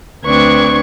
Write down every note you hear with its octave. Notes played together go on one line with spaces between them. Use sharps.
D2 C4 D4 B4 C#6 G#6